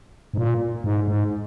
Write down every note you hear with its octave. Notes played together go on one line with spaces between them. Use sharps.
G#2
A#2
G#2
G#2